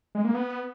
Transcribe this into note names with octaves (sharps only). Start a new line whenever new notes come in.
G#3
A#3
B3